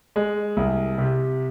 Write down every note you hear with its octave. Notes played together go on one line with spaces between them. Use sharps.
G#3
C2
C3